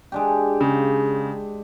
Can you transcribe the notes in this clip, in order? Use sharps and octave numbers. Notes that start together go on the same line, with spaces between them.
G#3 D4 G4
C#3